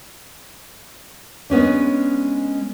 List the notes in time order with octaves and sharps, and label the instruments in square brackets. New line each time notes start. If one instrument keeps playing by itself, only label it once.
[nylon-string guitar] G#3 B3 C#4 D4